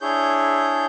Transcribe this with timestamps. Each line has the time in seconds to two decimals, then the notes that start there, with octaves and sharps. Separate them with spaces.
0.01 D4 E4 G#4 C#5 G6